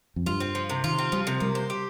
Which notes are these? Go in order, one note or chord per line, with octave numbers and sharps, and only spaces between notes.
F2
G2 F4
C4
F3
C3
D#3 F4
C4
F3 G3
C3
G3 A#3
C5
G4